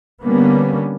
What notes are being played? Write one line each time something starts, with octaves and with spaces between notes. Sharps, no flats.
D3 G3 A#3 B3 C#4